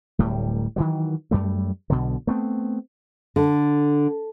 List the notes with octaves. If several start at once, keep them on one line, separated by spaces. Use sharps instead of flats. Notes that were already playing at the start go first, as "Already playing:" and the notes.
D1 A2 G3
D#3 E3 F#3
F#2 G3 A3
B1 B2 D3
A3 B3 C4
D3